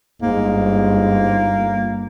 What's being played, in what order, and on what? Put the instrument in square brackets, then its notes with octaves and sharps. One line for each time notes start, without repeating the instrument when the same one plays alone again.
[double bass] G1 [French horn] G#2 [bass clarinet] A#3